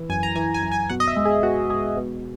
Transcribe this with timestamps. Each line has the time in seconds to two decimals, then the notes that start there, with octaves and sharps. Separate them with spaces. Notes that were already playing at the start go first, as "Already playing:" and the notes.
Already playing: E3
0.09 F#2 G#5
0.23 A#5
0.35 E3 G#5
0.54 G#5
0.62 F#2
0.72 G#5
0.89 B2 F#5
1.00 D#5
1.08 E5
1.16 G#3
1.25 G#4
1.43 B2 F#4
1.70 G#3 G#4
1.97 B2